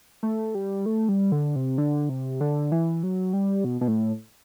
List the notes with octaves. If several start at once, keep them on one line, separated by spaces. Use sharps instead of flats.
A3
G3
A3
G3
D3
C3
D3
C3
D3
E3
F#3
G3
B2
B2
A2